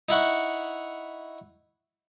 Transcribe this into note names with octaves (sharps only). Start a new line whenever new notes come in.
D#4 E4 F#5 C#6